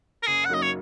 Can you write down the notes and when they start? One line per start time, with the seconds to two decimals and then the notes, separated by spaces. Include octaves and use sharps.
0.23 A#4
0.27 F#1 G#4
0.45 F#5
0.49 F#2 F#3 A#3 D#4 D#5
0.62 C#5